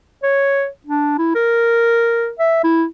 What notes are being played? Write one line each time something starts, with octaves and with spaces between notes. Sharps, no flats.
C#5
D4
E4
A#4
E5
E4